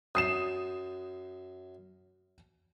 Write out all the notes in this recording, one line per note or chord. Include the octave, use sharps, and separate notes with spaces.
F#2 D#6 C7 E7